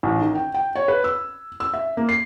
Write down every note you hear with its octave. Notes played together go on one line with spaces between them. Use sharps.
A1
D#3
G5
G5
C#5
B4
E6
E6
E5
A#3
C7